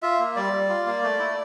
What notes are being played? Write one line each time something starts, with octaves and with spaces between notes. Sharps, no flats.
F4 E5
A#3
G3 D5
G3
F4
A#3
A3
E4